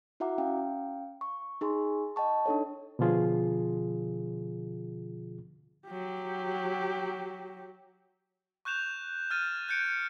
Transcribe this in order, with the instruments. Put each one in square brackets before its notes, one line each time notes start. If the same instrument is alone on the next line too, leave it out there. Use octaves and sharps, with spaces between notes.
[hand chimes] E4 F#4 E5 F#5 A#5 D6
C#4 F5 G5
C#6
D#4 G#4 G#5 C6 C#6
D#5 G5 A5 C#6
D4 D#4 A4 C#5
[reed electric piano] B2 D3 F3 F4 G#4
[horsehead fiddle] F#3 G4
[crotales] C#6 F#6 G6 E7 F7
F6 G#6 A6 D#7
F#6 G6 C#7 D7